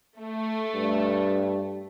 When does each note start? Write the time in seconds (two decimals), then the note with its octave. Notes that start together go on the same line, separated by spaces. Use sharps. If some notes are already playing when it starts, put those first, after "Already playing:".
0.19 A3
0.75 G2